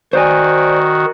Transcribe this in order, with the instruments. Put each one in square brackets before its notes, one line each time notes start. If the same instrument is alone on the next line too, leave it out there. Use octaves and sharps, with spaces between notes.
[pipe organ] D#3 F#4 [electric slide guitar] C5 D5 G#5